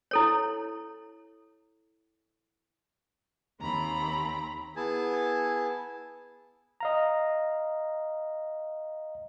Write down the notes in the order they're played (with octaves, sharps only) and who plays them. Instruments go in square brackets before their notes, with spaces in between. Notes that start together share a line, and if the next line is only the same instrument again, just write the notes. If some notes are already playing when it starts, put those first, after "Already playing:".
[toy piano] E4 A4 C#5
[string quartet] D#2 C4 A#5 B5
[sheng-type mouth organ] B3 E4 G#4 G#5 A5
[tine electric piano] D#5 F5 A#5